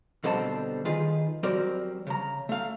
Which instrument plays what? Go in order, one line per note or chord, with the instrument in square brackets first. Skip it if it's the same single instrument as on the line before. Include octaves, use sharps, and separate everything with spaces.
[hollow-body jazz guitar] B2 D3 G3 C4 D5 A5
D#3 F4 G#4 B4
F#3 G3 C4 A#4 C5 D5
C#3 A#5
A3 F5